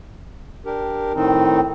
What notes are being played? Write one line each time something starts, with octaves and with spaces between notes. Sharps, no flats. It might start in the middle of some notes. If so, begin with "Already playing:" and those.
D4 G4 A#4
A2 D#3 C4 D#4